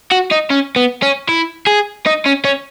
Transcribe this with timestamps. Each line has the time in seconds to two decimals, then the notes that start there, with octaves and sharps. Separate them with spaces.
0.11 F#4
0.31 D#4
0.50 C#4
0.76 B3
1.02 C#4
1.29 E4
1.67 G#4
2.07 D#4
2.26 C#4
2.45 C#4